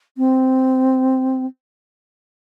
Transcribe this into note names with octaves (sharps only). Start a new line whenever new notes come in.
C4